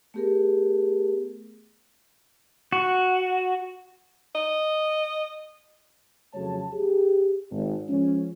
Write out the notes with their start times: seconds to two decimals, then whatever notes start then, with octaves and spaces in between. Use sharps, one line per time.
0.14 A3 B3 G4 G#4 A#4
2.73 F#4
4.35 D#5
6.34 F2 C#3 F#3 A3 C#5 A5
6.73 G4 G#4
7.51 G#1
7.89 F3 G#3 C#4